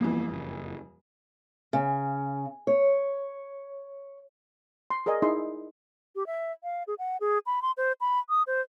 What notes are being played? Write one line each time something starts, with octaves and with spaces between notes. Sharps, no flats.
D#1 F2 E3 A#3 B3
F#1
C#3
C#5
C6
G#4 A#4 D5 D#5 G#5
D#4 E4 G#4 E5 C6
G4
E5
F5
G#4
F#5
G#4
B5
C6
C5
B5
D#6
C5